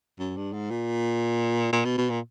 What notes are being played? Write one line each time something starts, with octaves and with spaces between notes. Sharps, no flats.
F#2
G2
G#2
A#2
A#2
B2
B2
A#2